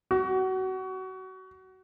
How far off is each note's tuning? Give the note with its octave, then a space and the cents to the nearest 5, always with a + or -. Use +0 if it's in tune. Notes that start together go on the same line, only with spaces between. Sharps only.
F#4 +25